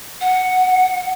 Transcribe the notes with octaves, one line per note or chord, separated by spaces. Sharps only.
F#5